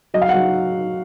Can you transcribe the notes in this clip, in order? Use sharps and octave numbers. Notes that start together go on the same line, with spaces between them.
F#3 D#5
F5
F#5
F#3